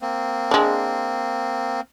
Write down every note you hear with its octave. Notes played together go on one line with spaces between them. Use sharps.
A#3 C4
G#3 D4